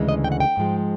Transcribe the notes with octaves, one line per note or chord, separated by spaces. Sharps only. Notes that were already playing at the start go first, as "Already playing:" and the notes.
Already playing: D2 C#3 E3 G#3
D#5
G5
F#5
G5
G#2 F3 G#3